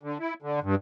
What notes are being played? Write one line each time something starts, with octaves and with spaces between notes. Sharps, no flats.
D3
E4
D3
G2